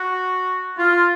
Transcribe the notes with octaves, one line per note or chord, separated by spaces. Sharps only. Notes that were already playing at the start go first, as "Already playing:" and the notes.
Already playing: F#4
F4